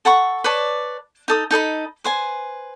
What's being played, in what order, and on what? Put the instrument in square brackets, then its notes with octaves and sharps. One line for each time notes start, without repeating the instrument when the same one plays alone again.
[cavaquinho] A4 F#5 B5 C#6
B4 C#5 D5 A5
D#4 A4 D#6
D#4 A4 D#5 B5
B4 C5 G#5